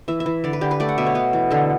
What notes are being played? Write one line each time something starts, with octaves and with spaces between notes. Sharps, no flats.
E3 E5
E5
E3
D3 D5
B4
D3 G4
B4
A3 D5
F#5
B2 E5
C#5
B3 B4
E3
D3 A4